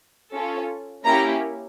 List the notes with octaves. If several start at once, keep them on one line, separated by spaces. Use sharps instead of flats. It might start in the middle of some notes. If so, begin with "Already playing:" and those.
C#4 F4 A4
A#3 C#4 E4 G4 A#5